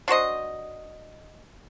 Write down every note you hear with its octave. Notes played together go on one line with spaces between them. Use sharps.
D4 F#4 C5 D#5